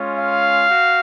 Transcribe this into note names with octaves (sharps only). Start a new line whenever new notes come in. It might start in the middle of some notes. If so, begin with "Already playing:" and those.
Already playing: G#3 C#4 F4
F5
F#4